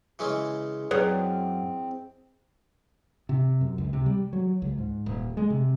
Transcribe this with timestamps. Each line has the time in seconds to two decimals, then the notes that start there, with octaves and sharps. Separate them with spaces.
0.19 C#3 E3 G#3 C#4
0.91 F#2 C4 G#4 B4 C#5
3.29 C3
3.61 F#2
3.78 C#2
3.93 C3
4.06 G3
4.33 F#3
4.62 C#2
4.78 G#2
5.06 D#1
5.37 G#3
5.50 C3